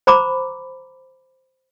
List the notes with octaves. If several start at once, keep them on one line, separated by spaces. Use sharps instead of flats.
C5 A#5 B5 D6